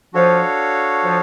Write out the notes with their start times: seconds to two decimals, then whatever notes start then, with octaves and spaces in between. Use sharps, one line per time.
0.13 F3 D4 F#4 A4 C#5 F5
1.04 F3